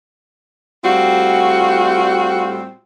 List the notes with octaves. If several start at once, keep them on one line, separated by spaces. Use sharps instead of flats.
A2 G3 C4 F4 F#4